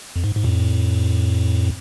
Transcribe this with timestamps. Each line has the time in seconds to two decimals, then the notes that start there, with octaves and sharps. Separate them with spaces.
0.16 F2
0.24 G#2
0.36 G#2
0.44 F2 A2